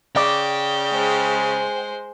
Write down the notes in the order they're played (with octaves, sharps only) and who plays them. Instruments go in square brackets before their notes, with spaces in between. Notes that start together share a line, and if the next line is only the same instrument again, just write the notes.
[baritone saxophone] C#3 [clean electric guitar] D5 [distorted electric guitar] G5
[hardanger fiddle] G#3 C5